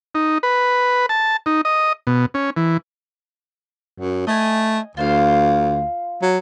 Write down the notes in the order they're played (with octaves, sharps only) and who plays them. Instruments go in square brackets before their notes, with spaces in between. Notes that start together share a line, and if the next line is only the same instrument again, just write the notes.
[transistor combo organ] D#4
B4
A5
D#4
D#5
B2
C#4
E3
[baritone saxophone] F#2
[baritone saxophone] A3 [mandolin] D#5 G#5
[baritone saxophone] D2 [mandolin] F4 C5 F5
[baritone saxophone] F#3